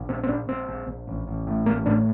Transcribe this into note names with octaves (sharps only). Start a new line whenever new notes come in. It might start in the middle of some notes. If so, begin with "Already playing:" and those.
Already playing: A#1
A#2 C4
C4
A#1 D4
A#1 C4
A#1
A#1
A1
A1
A2
A1 A#3
A2 D4